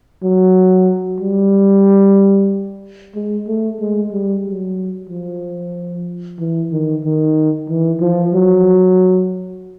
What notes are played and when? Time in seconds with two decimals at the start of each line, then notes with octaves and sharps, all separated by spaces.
0.23 F#3
1.20 G3
3.15 G#3
3.47 A3
3.80 G#3
4.12 G3
4.45 F#3
5.10 F3
6.39 E3
6.72 D#3
7.04 D#3
7.69 E3
8.01 F3
8.34 F#3